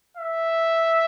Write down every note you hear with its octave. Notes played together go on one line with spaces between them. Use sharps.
E5